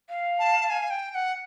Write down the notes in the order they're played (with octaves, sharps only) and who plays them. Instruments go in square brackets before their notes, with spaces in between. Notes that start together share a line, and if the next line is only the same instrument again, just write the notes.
[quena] F5
[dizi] A5
G#5
G5
G5
F#5